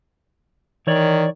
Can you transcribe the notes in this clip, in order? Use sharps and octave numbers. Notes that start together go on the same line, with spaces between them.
D#3 E3 C#5 D5